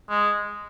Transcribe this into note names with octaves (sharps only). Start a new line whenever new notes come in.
G#3